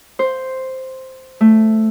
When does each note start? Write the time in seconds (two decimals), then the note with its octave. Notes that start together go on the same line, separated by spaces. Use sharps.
0.19 C5
1.41 A3